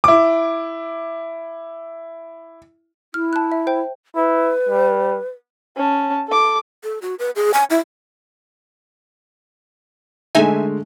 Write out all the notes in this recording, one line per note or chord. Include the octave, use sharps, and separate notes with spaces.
E4 D6
E4 F6
A5 F#6
E5
C5 G5
E4 B4
G3
C#4 A5
A4 D6
A4
F#4
B4
G#4
G#5
E4
D3 G#3 A3 D#4 E5 G#5